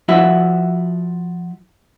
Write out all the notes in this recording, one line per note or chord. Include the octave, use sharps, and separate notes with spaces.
F3 E4 F#4 E5